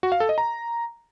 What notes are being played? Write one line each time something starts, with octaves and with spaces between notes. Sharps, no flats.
F#4
F5
A4
D#5
A#5